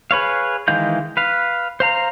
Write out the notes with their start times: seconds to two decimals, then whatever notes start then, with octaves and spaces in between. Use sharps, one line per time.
0.11 G#4 B4 C#5 F5
0.68 D#3 E3 G#3 F5 G6
1.17 B4 F5
1.80 C5 F5 A#5